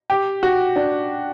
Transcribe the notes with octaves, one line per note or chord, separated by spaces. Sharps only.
G4
F#4
D4